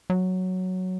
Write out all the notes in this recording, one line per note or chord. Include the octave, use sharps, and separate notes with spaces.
F#3